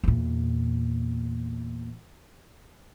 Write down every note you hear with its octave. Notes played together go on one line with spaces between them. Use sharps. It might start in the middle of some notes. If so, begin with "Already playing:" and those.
E2 A#2